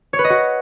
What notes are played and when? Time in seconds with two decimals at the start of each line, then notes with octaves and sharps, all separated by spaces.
0.13 C#5
0.19 B4
0.24 D#5
0.30 F#4